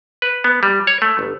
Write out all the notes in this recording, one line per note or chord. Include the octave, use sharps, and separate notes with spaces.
B4
B3
G3
C#5
A3
G1